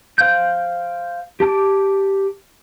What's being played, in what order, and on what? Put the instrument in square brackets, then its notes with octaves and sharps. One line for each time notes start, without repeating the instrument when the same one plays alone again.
[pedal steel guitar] C5 F5 G5 F#6 G6
G4 A5 D6